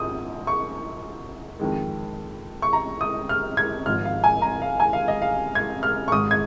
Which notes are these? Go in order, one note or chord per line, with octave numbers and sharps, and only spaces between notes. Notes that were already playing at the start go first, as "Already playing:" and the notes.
Already playing: A#1 G#2 D#6
C#6
F2 D#3 G#3
C#6
A#5
D#6
F6
G#6
G#1 G#2 F3 F6
F5
G#5
A#5
F5
G#5
F5
D#5
F5
G#6
F6
C#6
G#1 G#2 G#3 D#6
G#6